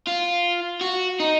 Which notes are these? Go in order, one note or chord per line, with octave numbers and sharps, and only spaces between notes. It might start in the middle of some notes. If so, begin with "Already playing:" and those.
F4
F#4
D#4